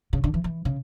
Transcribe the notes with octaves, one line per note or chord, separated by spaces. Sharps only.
C#3
D3
E3
E3
C#3